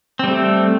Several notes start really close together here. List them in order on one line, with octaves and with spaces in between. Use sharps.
C4 G3 A3